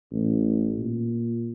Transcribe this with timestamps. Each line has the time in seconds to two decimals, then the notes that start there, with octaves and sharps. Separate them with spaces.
0.11 A1
0.78 A#2